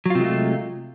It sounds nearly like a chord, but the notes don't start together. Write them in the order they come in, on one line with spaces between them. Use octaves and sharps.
F#3 F4 C3 G#3 A3